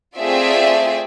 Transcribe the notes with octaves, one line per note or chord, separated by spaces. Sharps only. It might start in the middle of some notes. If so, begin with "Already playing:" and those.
A3 C4 F4 G#4 D5 E5